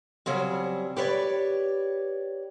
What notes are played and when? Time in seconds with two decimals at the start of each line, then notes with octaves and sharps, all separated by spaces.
0.26 C#3 F#3 G3 C4
0.97 G4 B4 C#5 D5